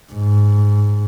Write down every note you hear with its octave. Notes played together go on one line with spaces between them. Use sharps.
G#2